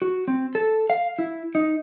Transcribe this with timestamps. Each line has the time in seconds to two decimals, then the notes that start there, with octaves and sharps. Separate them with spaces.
0.02 F#4
0.28 C4
0.55 A4
0.90 F5
1.19 E4
1.55 D#4